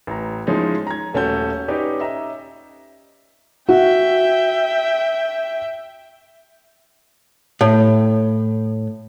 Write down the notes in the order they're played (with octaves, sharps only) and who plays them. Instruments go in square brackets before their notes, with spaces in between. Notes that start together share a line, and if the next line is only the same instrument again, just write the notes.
[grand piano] A1 A#5
F3 G#3 C#4 D#4 E4
A#5 G#6
D#1 A3 C#4 F#4 A4 G6
C#4 D#4 G4 B4 C#5 D5
D#5 E5 A#5
[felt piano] F#4 [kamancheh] E5 G5
[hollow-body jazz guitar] A2